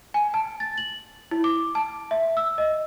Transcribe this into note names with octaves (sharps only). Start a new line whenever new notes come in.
G#5
A5
A6
F#7
E4
D6
A5
E5
E6
D#5